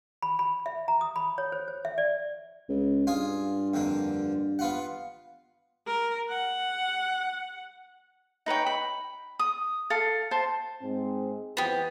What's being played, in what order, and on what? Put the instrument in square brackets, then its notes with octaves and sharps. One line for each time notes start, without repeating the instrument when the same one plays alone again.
[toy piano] B5
B5
E5
A#5
D#6
B5
C#5
C5
C5
E5
D5
[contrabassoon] C#2
[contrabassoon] G2 [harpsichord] F4 G#5 D#6
[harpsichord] F2 D3 A#3
B3 F4 F#5
[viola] A#4
F#5
[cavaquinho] D#4 B4 C#5 G5
B5
D#6
A4 F5
C5 A5
[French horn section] G#2 G#3 C4
[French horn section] F2 E3 F3 [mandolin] B3 G4